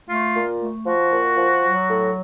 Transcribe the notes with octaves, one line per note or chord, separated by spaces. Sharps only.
A3 F4
A#2
A3
F3 F#4
A#2
F3
F#3
A2